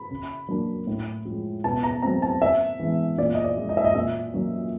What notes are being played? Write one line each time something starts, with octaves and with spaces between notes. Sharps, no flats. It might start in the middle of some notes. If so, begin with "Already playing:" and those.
Already playing: B5
C#3
F#3 A#3 D4
A2
F3 G#3
B2 A5
A#5
F#3 A3 C4 A#5
A5
C#3 E5
E3 G#3 B3
A#2 D5
D#5
D5
F3 G#3
D#5
E5
D#5
A#2 E5
F#3 A#3 C#4